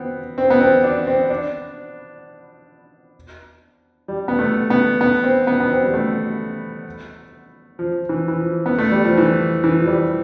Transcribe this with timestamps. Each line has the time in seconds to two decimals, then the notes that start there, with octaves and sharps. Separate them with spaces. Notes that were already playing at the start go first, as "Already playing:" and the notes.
Already playing: B3 C4
0.38 C4
0.50 B3
0.60 C4
0.84 D4
1.07 C4
1.30 D4
4.08 G3
4.28 B3
4.39 A3
4.70 B3
5.01 B3
5.24 C4
5.47 B3
5.60 B3
5.70 C4
5.84 G3
5.94 A3
7.79 F3
8.09 E3
8.28 E3
8.40 F3
8.66 B3
8.78 A3
8.92 G3
9.05 F3
9.18 E3
9.64 E3
9.80 F3
9.87 G3